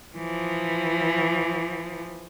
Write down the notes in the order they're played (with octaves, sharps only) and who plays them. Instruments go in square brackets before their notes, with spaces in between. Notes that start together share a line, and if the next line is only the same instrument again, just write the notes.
[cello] E3 F3